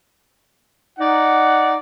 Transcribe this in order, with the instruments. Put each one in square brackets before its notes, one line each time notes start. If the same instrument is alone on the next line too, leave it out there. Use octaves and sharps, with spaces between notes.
[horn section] D#4 D5 F#5